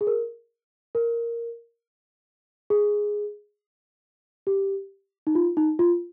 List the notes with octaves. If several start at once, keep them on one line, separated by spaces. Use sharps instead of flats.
G#4
A#4
A#4
G#4
G4
D#4
F4
D#4
F4